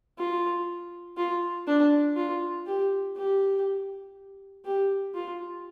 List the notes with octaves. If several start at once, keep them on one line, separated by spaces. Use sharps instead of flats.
F4
F4
D4
F4
G4
G4
G4
F4